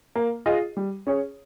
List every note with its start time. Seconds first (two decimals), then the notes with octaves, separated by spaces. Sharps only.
0.16 A#3
0.46 F4 G#4 D#5
0.77 G3
1.07 C#4 G#4 C#5